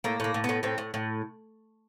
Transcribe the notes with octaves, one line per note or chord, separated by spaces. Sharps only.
A2 A#3
A2 A#3
A2
B3
A2
A2 C4
A2
A2